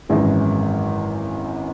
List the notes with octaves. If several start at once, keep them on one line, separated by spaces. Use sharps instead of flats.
G#1 F#2 E3 G#3 E4